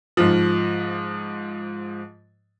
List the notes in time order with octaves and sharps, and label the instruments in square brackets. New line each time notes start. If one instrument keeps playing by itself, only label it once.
[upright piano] G#2 F3